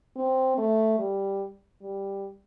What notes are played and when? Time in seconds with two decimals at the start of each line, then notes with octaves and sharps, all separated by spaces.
0.16 C4
0.58 A3
0.99 G3
1.82 G3